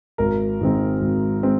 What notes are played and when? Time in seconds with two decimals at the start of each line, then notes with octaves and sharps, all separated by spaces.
0.18 G#1 A#4
0.61 G#2 D#3 G#3 C4
1.01 G#1
1.43 G#3 C4